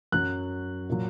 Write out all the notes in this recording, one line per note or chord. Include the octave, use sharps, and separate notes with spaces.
F#2 F#3 F#6
A#2 F#3